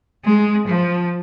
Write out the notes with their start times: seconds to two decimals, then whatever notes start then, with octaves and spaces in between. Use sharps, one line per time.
0.24 G#3
0.67 F3